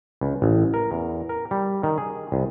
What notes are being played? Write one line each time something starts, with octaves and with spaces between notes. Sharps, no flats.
C#2
A1
A#4
E2
A#4
G3
D#3
G#4
C2